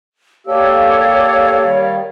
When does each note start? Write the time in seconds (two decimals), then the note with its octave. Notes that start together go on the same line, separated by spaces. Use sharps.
0.47 A#3 G4 A4 C#5 D5 F5
1.63 D#3 G3